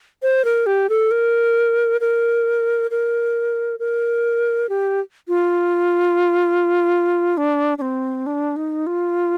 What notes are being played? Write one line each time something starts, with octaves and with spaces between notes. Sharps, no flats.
C5
A#4
G4
A4
A#4
A#4
A#4
A#4
G4
F4
D4
D4
C4
D4
D#4
F4